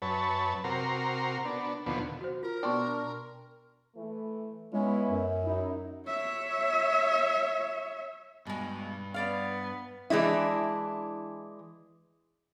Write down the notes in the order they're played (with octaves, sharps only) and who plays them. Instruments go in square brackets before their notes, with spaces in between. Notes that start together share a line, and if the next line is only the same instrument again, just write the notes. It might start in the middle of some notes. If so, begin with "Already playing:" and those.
[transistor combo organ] F#2 B4 C#5 A5
C3 F#4 A#4 A#5 C6
B3 D4
D#2 B2 D3 F3 B3
[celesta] F#4 C5
[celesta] F4 [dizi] A#4
[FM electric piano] B2 D4 [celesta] G5 C6 C#6
[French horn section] E3 A3
[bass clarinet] G#3 [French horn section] B3 C#4 E4
[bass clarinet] F#2
[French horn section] F#3 D#4 E4
[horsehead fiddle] C#5 E5
[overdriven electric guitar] G2 [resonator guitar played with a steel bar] B2 G#3
[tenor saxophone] B3 [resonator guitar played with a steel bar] C#5 D5 F5
[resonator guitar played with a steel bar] E3 G#3 D4 E4